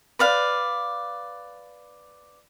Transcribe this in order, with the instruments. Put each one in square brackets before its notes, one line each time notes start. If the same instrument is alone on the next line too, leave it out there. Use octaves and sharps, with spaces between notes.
[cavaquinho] B4 D5 F5